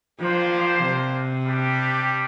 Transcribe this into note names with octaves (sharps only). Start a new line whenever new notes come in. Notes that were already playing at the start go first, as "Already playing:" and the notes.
F3 A#3 D4 G4 C5
C3
G3 D4 G4